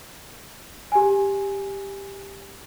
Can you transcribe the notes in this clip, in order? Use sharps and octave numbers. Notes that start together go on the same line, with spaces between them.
G4 G#5